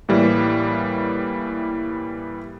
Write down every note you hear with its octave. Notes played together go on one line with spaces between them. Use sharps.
A2 E3 G3 A#3